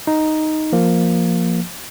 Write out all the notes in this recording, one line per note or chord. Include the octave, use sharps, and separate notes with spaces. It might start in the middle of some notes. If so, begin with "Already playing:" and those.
D#4
F3 A#3